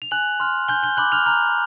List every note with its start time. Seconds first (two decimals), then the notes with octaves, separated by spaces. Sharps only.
0.02 F7
0.11 G#5 F#6 F#7
0.40 C6 F6
0.68 G#5 G6 G7
0.83 G6 G7
0.97 B5 D6 F#6 F#7
1.12 F6 F7
1.26 A#5 F6 F7